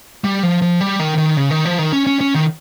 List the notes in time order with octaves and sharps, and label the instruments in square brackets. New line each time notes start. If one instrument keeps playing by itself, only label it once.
[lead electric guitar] G3
F3
F3
G3
D#3
D#3
C#3
D#3
F3
D#3
C#4
C#4
C#4
D#3